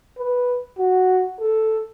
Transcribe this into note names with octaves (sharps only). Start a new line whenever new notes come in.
B4
F#4
A4